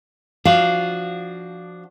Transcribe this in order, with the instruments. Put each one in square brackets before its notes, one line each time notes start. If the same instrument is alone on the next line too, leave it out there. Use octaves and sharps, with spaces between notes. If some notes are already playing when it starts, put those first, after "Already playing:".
[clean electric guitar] F3 D4 F#4 [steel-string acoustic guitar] F5